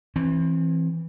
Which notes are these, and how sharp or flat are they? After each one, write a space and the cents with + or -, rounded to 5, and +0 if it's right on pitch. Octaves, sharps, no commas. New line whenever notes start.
E3 +0 C4 +30